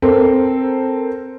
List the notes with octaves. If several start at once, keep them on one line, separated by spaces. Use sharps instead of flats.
C4 A4 A#4 C5